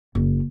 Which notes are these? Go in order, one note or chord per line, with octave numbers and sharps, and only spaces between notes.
F#1